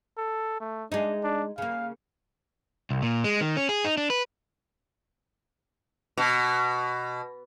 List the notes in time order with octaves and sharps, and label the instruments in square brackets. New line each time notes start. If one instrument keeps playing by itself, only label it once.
[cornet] A4
A3
[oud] G#3 D#4 [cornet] D4
[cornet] D4
[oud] C#3 A#3 [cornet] F5
[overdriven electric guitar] C2
A#2
G#3
D#3
C#4
G#4
D#4
D4
B4
[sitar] B2